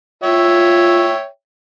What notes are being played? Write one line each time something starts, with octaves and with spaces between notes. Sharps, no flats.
F4 C#5 E5 G5